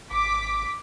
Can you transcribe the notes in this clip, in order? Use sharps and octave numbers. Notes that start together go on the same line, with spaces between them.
G#1 D6 B6